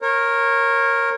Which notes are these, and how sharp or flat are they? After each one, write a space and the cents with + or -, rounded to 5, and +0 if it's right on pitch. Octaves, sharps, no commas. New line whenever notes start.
A#4 +0 C#5 -25